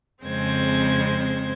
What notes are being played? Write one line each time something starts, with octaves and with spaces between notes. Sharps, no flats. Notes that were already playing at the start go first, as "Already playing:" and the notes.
F2 C#3 G#3 C4 C5 G#6